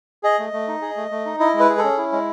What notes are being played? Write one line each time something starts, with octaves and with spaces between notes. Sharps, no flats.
G#4 D#5
A3
A3
D#4
G#4
A3
A3
D#4
E4 D#5
G#3
B4
G#4
A4
C#4
E4
G#3